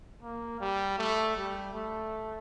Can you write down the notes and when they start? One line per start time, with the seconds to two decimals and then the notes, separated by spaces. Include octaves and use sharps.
0.23 A#3
0.61 G3
0.98 A3
1.37 G3
1.74 A3